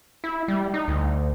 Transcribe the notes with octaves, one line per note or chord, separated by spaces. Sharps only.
E4
G3
D#4
D2